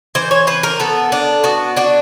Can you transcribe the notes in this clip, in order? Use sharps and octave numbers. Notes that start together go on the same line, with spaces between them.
E3 C5
C#5
C4 B4
A#4
B3 A4
D4
B3 F#4
D4 F#4